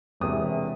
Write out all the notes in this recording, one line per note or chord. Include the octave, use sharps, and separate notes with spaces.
E1 E2 C3 E3 D#6